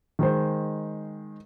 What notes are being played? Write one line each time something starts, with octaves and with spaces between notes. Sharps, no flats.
D#3 G#3 C5